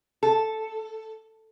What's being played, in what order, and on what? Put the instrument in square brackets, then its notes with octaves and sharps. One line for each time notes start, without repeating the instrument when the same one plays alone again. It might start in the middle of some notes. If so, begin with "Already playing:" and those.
[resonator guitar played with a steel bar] A4